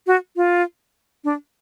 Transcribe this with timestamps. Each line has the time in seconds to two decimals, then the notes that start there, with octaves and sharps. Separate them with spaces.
0.07 F#4
0.36 F4
1.24 D4